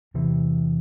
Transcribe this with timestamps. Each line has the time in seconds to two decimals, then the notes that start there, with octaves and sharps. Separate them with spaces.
0.14 E2 C3 E3